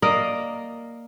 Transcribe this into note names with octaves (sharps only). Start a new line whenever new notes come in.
A#3 A#4 D5 D#5